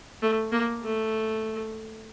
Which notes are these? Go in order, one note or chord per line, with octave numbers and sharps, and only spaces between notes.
A3
A#3
A3